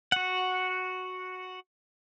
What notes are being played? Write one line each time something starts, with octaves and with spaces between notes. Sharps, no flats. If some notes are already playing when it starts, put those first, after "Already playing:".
F#4 F#5